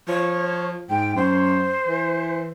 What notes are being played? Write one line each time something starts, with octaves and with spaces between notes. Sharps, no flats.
F3 C#5
G#2 G5
F#2 C5
E3